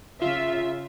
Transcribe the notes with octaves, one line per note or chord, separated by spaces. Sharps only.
C#3 F4 E5